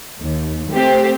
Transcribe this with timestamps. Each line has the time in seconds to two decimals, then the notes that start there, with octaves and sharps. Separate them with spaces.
0.20 D#2
0.71 A3 C4 G4 C5